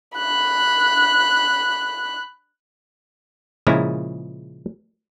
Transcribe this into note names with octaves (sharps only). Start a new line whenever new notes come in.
B5 F#6
A#2 C#3 F3 G#3 E4 A#5